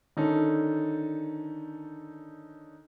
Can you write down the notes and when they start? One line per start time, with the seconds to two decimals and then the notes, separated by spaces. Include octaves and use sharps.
0.17 D3 D#3 C#4 D#4 A4